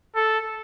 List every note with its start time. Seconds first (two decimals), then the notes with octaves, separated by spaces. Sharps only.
0.15 A4